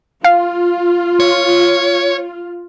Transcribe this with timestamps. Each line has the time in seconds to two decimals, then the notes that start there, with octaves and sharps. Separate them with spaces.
0.24 F4 F5
1.20 C#5